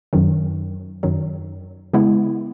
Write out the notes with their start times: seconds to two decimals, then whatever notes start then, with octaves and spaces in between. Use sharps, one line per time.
0.13 F#2 D#3 F#3
1.03 F#2 D#3 F#3
1.93 C#3 G#3 B3 E4